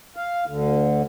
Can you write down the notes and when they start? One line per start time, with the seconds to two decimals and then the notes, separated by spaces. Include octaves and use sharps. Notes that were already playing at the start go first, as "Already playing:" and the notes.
0.16 F5
0.47 D2 D3